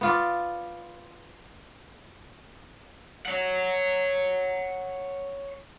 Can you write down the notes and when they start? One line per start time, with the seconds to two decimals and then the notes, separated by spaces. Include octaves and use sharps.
0.01 B3 F4 D5
3.26 C#5 F#5